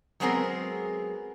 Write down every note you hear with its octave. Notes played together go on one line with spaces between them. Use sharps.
F#3 G#3 B3 C4 G#4 A#4